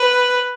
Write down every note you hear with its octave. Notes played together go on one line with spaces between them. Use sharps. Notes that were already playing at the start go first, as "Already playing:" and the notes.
Already playing: B4